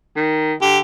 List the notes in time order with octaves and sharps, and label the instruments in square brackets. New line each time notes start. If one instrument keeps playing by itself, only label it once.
[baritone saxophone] D#3
[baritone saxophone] D3 [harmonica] G4